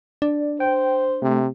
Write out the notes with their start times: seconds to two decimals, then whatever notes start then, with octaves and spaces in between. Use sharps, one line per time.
0.22 D4 D5
0.60 C5 G5
1.22 C3 A3